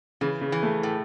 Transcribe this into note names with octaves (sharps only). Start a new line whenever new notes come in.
C#3 E3
C#3
E3
A3
A2